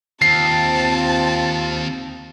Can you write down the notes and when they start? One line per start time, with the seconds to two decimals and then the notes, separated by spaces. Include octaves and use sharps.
0.22 D#2 C4 F4 A5 C7